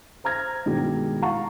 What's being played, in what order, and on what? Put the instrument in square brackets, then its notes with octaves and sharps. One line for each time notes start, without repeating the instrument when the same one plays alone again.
[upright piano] C5 A#5 F6 G#6 A#6
G2 B2 D#3 G#3 G4
F5 F#5 A5 A#5 C#6